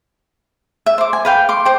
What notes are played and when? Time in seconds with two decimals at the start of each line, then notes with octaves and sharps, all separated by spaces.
0.86 E5
0.98 C5 D6
1.13 G#5
1.25 B4 F5 G5
1.49 C6 D6
1.65 C5 G5